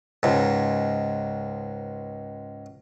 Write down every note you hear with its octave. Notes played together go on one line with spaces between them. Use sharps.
C#2 G#2